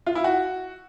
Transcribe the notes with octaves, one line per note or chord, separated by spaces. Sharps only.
F4
E4
F#4